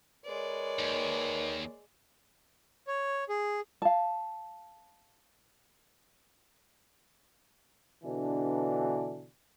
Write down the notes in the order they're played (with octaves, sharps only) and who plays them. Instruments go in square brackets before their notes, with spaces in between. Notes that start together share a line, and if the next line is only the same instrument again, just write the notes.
[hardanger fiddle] G#3 D5 [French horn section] A#4 B4 C#5
[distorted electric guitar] D#2
[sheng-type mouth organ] C#5
G#4
[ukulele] F5 A5
[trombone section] B2 D3 E3 D4